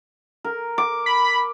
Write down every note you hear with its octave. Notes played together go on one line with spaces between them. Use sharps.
A#4
D6
B5